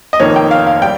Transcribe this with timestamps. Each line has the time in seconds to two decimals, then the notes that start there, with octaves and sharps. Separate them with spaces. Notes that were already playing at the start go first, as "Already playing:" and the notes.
0.13 D#5
0.20 F1 F2 D#3 A#3 D#4 C#5
0.36 G5
0.51 F5
0.67 F5
0.82 G3 G5